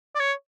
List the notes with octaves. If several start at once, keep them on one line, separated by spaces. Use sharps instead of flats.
D5
C#5